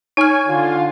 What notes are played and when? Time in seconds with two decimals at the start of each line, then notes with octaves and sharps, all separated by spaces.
0.17 D#4 C#5 G#5 F6
0.48 D3 F4